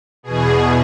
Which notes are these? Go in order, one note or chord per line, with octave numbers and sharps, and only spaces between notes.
E2 B2 G#4